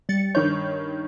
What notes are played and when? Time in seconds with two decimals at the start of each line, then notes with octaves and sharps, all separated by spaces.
0.09 G3 A6 C#7
0.35 G2 D#3 C#5 G6